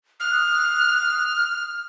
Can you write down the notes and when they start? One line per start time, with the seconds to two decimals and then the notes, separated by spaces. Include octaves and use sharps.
0.20 D#6 F6 F#6